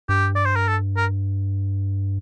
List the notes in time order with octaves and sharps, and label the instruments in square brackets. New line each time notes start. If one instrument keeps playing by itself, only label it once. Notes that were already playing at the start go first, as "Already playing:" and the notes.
[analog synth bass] G2 [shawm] G4
[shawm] D5
C5
A#4
A4
A#4